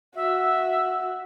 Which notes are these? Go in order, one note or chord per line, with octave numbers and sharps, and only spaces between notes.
F#4 E5